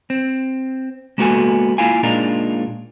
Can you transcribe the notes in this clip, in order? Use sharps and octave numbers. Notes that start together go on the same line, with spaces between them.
C4
G#3 A#3 B3 F#4 A4 G#5
A#3 E4 F4 F5 G#5
A#2 G#3 D4 D#4 F4 A#4